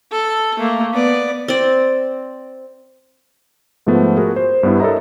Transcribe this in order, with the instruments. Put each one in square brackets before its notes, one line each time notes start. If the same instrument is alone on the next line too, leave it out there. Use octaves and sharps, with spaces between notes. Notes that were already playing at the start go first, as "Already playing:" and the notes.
[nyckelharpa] A4
A3 A#3
B3 D5
[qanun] C4 D5
[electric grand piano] G#2 F3 A3 B3
F#4 G#4 A#4
C5
G2 B3 E4
A4 A#4 C#5 D#5 E5 A#5